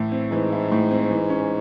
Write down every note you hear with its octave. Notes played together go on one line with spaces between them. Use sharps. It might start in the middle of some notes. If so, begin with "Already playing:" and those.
Already playing: A2 E3 E4
C4
G#2 E3
E4
A2
C4
E3
C#4